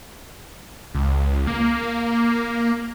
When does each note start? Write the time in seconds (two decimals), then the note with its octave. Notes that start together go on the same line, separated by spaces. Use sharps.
0.95 C#2
1.47 A#3